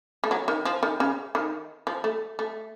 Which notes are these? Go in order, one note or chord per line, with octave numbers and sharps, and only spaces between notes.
A3
F#3
D#3
F3
D#3
C#3
D#3
F3
A3
A3